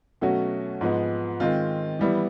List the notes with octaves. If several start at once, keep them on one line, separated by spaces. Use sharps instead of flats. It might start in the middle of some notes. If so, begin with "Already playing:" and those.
B2 F#3 A3 C#4 F#4
G#2 F3 G#3 B3
D#3 G#3 C4 F4
E3 G3 B3 E4